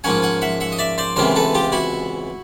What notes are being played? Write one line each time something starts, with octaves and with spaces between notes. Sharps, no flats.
G#2 F3 A#3 C#4 F#5 G#5
F#5 G#5
E5 F#5
E5 F#5
D#5
D5 E5
C5 D5
C#2 C3 E3 G#3 B3 A#4 C5
A4 B4
F4 G4
E4 F#4